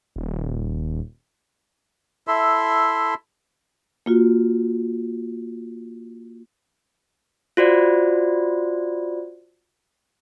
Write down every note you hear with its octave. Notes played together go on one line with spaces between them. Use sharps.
D#1
E4 A4 E5 C6
A#3 F4 F#4
F4 F#4 C5 D5